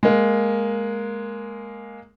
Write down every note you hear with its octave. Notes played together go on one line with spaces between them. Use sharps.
G#3 A#3